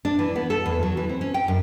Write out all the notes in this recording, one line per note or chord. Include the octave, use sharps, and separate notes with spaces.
D4
E3
B3
A4
E2
F#3
E3
C4
C#4
G5
F#2